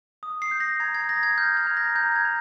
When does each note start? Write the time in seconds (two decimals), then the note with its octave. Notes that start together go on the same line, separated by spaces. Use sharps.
0.23 D#6
0.42 C7
0.51 G6
0.60 A#6
0.80 A#5 G#6
0.94 G#6
1.09 D#6 A#6
1.23 G#6
1.38 F6 G6
1.57 G#6
1.67 A#5
1.77 A#6
1.95 A#5 G6
2.16 G#6
2.25 A#5